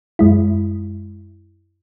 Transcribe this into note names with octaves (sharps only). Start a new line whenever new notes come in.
F#2 G#3 E4